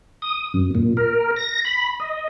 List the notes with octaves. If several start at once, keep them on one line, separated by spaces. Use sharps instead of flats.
D#6
F#2
A#2
A#4
A#6
B5
D#5